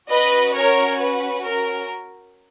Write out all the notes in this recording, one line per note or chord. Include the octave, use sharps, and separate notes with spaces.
C#4 F#4 B4 D#5
A#4 C#5
B4
A#4